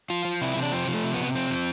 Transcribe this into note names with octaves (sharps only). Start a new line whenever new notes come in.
F3 F4
F3
C3 E4
C3
D4
F3 C4
F3
A3
C3
B3
C3
F3 C4
F3